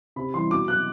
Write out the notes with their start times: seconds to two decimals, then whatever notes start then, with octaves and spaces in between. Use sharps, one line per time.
0.16 C3 B5
0.33 E3 G3 C6
0.50 B2 D6
0.68 F#3 F#6